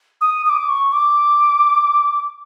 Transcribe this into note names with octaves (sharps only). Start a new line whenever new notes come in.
D#6
D#6
D6
C#6
D6